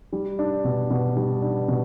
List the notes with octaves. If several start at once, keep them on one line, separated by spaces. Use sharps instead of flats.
G3
D4
B2
B2
G3
D4
B2